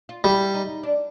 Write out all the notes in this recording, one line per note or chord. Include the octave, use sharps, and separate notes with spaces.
F4
G3 E4
D#4
D4